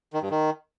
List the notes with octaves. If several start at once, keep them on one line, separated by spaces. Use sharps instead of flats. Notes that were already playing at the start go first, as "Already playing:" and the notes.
D#3
G2
D#3